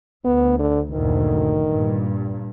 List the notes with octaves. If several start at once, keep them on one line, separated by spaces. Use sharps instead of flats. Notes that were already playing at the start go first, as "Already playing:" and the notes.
D2 B3
D3
F#1 D2 A#2 D#3
G2 A#2